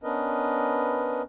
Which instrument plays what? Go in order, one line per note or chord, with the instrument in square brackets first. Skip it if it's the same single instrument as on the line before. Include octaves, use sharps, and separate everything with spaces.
[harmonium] B3 C#4 D4 A#4 B4 D#5